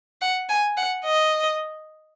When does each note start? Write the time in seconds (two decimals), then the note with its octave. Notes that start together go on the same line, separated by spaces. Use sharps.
0.21 F#5
0.49 G#5
0.77 F#5
1.05 D#5